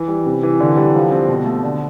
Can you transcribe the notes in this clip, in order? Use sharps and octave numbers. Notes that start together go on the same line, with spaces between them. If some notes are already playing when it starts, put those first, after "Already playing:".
Already playing: E3
G3
C3
E3
D3
G3
F3
C4
B2
A3
D3